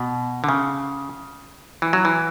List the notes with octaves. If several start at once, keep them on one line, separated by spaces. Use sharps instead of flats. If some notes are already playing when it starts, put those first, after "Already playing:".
Already playing: B2
D3
C#3
E3
F#3
E3